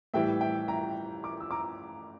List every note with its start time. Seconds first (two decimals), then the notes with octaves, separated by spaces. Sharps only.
0.14 A2 E3 G3 E5 G5
0.41 E5 G5
0.68 G5 A#5
1.24 A#5 D6
1.40 E6
1.51 A#5 D6